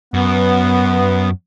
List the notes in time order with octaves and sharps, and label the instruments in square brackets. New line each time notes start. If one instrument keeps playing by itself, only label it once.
[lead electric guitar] F#2 [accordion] B3